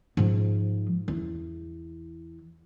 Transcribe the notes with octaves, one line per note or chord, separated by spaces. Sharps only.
G#2 F3
E2